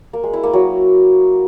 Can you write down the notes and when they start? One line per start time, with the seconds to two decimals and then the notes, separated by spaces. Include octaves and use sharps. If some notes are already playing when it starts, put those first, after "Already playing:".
0.13 A#3
0.23 G#3
0.33 E4
0.43 A#3
0.53 F#3